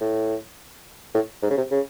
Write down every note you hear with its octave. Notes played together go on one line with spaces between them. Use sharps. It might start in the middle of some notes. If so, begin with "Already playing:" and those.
A2
A2
G#2
C#3
C3
C#3